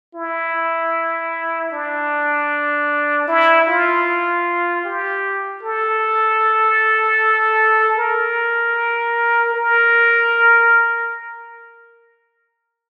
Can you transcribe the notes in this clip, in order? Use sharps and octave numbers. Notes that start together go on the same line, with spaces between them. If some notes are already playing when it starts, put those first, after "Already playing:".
E4
D4
E4
F4
G4
A4
A#4
A#4